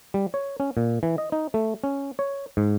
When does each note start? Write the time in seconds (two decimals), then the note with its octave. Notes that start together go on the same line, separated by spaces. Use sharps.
0.14 G3
0.34 C#5
0.60 C#4
0.77 A#2
1.03 E3
1.18 D#5
1.32 D#4
1.54 A3
1.84 C#4
2.19 C#5
2.57 G#2